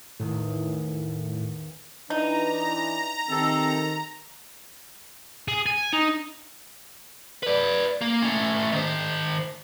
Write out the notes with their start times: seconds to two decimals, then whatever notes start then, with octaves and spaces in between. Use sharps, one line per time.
0.20 A1 E2 A2 D#3
2.10 E3 D4 D#4 A#5
3.30 C3 D#3 C4 A4
5.48 G#4
5.66 G#5
5.93 D#4
7.43 B4 D5
8.01 A#3
8.22 A3 C#4
8.72 D#3 C5